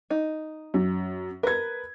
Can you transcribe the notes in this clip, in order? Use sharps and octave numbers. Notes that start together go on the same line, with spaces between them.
D#4
F#2
A#4 B4 G#6